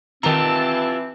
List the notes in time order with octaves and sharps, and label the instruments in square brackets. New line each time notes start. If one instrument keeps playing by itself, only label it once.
[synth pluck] D#3 A#5 [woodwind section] E3 C4 [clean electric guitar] E4 F4 G4 [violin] A5